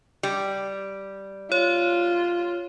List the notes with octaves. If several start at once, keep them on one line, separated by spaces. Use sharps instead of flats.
G3
F4 C#5